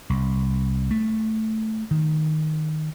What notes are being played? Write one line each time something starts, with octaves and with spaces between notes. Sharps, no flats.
C2
A3
D#3